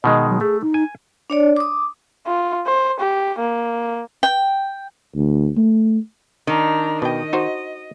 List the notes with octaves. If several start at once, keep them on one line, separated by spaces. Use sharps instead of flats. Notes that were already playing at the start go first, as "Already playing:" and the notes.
B2 D#3 G#3 D#5
F#3
A3 G#4
D#4
G#5
D4 C#5 D5
D6 D#6
F4
C5
G4
A#3
G5
D2
A3
D#3 D4 A#5
B2 D#5 G5
D#4 F#4 C5